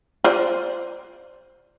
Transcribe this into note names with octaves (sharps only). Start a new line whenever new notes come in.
F4 C5 D5